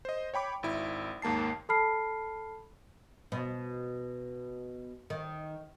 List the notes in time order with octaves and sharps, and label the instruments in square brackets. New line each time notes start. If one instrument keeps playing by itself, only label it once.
[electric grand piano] C5 D#5
C#5 G5 B5 D6
G#1 E4
D#2 G#2 A#3 A5 C7
[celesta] A4 A5 B5 F6 C7
[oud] B2
D#3